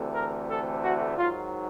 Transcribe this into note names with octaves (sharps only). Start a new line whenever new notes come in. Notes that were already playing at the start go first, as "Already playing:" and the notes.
Already playing: D2 C3 E3 A3 C4
A#4
A4
F#4
G#2 D#3 F#3 F4